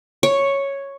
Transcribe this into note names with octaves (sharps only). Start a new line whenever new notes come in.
C#5